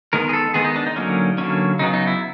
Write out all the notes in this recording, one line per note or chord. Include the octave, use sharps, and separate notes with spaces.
D#3 G#3 B3 A#4
G#4
A4
D#3 G#3 B3 G#4
D#4
D4
D#4
D3 F#3 A#3 C#4
D3 F#3 A#3 C#4
C#3 F#3 B3 D#4
D#4
E4